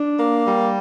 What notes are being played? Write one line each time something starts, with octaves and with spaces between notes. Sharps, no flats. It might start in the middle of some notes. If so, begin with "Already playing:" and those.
Already playing: D4
A#3
G3